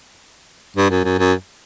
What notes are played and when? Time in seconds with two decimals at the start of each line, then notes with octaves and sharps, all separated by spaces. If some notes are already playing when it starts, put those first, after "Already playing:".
0.76 G2
0.90 F#2
1.04 F#2
1.18 F#2